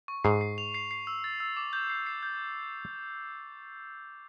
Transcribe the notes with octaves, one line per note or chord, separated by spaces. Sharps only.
C#6
G#2 C7
C7
F7
C7
C7
E6
A6
E6
D6
G6
C7
C7
G6